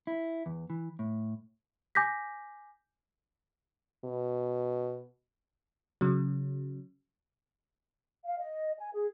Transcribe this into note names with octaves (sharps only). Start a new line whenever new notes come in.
E4
E2
E3
A2
G#5 D6 G6 A#6 B6
B2
C#3 F#3
F5
D#5
G#5
G#4